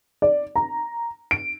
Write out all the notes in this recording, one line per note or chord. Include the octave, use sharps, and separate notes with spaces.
D5
A#5
D7